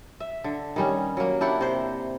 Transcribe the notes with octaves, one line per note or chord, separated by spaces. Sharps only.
E5
D3
D#3 G3 C#4
F#3 A#3
D4 E4 G4 F#5
C3 C5